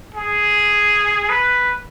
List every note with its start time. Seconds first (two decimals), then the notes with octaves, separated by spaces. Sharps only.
0.14 G#4
1.29 B4